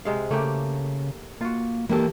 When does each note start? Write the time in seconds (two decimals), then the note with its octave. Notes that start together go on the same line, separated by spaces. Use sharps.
0.05 C3 G#3 F5
0.31 C#3 A3 A#3 G4
1.41 A#3 F4 F#4
1.89 E3 A#3 G4 A4